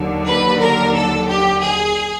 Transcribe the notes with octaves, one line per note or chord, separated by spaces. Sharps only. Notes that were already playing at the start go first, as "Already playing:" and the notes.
Already playing: D#2 D3 F#3
B4
A#4
A4
G4
G#4